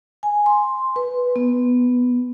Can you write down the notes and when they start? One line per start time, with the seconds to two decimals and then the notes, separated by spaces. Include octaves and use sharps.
0.23 G#5
0.46 C6
0.96 B4
1.36 B3